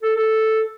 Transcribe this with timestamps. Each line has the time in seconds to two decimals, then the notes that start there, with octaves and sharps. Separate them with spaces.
0.02 A4
0.16 A4